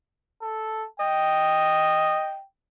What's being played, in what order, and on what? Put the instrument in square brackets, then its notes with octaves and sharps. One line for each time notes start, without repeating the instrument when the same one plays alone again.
[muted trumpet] A4
[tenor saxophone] D#5 [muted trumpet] G5